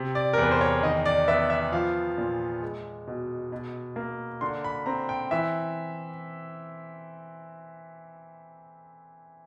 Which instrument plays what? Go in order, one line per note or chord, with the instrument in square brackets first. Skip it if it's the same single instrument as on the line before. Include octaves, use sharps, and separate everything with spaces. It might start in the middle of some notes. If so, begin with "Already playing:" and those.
Already playing: [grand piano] C3
D5
A#4
E2 B4
C5
C#5
D#3 D#5
D5
B3 E5
E5
F3 F5
A#2
G#3
B2
B2
A#3
D3 C6
B5
C4 A#5
G5
E3 E5